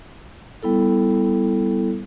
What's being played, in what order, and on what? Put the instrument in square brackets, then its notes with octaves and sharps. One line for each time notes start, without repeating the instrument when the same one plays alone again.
[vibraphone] G3 B3 E4 A4